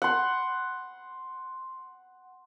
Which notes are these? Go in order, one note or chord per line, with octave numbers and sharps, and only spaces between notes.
F#5 C6